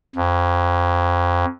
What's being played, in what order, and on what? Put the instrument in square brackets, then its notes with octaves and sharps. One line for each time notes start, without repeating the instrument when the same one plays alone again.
[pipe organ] F2